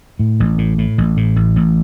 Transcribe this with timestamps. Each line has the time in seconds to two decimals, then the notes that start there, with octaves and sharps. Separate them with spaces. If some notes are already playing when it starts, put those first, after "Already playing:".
0.19 A2
0.40 A1
0.58 A2
0.78 A2
0.98 A1
1.17 A2
1.36 A1
1.56 A1